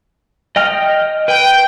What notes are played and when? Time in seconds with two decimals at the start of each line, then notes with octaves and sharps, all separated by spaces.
0.56 D#5 G5 F6
1.28 B4 G5